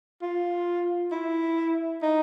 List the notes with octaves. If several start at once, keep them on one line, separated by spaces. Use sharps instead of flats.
F4
E4
D#4